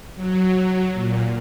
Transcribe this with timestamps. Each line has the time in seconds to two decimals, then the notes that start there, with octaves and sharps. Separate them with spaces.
0.15 F#3
0.94 A#2